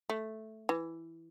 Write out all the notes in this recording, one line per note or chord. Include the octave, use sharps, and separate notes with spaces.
A3
E3